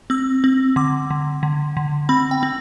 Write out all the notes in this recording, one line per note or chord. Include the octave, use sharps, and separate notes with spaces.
C4 E6
C4
D3 D6
D3
D3
D3
C4 B5
G5
C4